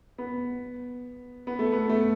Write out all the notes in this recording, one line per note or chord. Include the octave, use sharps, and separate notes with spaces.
B3
B3
A3
B3
A3